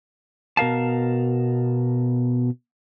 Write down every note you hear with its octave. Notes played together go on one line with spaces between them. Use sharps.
B2 A#4 F5 A5